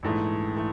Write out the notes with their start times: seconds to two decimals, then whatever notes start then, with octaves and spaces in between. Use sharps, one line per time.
0.03 A#1 G#2 E3 A3
0.56 E3 A3